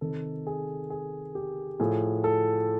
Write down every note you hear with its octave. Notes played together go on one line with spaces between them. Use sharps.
C3 D#3 A4
G#4
G#4
G4
A2 F3 G#4
A4